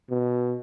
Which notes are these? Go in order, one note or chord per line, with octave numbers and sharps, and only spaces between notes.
B2